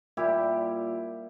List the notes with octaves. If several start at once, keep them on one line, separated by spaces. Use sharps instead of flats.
A#2 G3 E4 G4